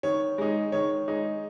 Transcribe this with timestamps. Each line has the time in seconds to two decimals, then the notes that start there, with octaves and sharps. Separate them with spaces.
0.03 D#3 C#5
0.38 G#3 D#4
0.72 D#3 C#5
1.08 G#3 D#4